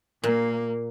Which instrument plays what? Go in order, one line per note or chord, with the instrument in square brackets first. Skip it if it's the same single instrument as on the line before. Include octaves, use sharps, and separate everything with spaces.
[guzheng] A#2 [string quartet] A#3